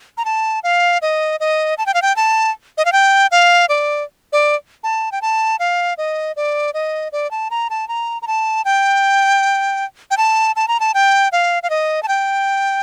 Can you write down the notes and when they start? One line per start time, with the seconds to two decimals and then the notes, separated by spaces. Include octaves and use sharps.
0.17 A#5
0.25 A5
0.64 F5
1.02 D#5
1.40 D#5
1.78 A5
1.86 G5
1.94 F5
2.02 G5
2.16 A5
2.78 D#5
2.85 F5
2.92 G5
3.31 F5
3.69 D5
4.32 D5
4.84 A5
5.12 G5
5.22 A5
5.59 F5
5.98 D#5
6.36 D5
6.74 D#5
7.12 D5
7.31 A5
7.51 A#5
7.70 A5
7.88 A#5
8.22 A#5
8.27 A5
8.65 G5
10.11 G5
10.17 A5
10.56 A5
10.68 A#5
10.80 A5
10.94 G5
11.32 F5
11.63 F5
11.70 D#5
12.03 A5
12.08 G5